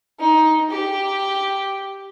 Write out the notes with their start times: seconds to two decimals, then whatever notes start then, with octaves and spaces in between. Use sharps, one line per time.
0.20 D#4
0.71 G4